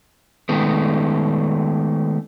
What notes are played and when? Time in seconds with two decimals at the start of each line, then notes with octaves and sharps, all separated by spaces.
0.49 D#3 G#3 A3 B3